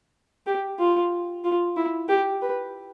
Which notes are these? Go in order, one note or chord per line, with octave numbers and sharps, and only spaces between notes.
G4
F4
F4
E4
G4
B4